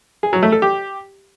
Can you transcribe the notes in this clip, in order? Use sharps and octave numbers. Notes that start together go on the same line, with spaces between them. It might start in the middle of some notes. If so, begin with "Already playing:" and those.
G#4
F#3
A3
A4
G4